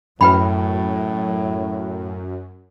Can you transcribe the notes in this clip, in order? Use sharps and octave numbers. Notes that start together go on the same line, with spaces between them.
F#2 A2 F#3 B4 G5 B5